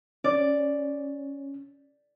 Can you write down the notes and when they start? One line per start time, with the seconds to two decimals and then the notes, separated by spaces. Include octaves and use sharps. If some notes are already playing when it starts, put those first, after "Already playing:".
0.24 C#4 D5